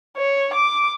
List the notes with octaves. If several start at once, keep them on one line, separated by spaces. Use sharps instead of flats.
C#5
D6